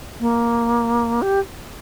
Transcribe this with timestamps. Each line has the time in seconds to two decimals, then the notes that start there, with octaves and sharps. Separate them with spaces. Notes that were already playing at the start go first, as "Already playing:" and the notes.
0.20 A#3
1.22 G4